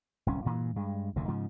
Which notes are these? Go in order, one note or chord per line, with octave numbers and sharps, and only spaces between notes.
D1 C2 C#4
G2 A#2 E3
G2 G#3
F1 D2 A#2 C#3
G#2 C#3 F3